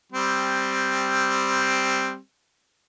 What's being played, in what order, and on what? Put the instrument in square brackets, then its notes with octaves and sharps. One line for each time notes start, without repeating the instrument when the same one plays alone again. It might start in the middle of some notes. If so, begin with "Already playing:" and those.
[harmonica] G3 C4